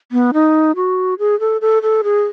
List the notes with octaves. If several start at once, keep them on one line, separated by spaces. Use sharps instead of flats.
B3
D#4
F#4
G#4
A4
A4
A4
G#4